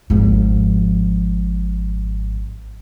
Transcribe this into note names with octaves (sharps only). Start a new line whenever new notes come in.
G#1 F3